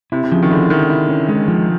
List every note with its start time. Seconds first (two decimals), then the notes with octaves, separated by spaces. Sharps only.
0.12 C3 E4
0.24 C3
0.32 C#3 F3
0.43 D#3
0.51 D3 E4
0.70 D#3 E4
0.90 E4
1.09 C#4
1.29 G#3
1.48 F3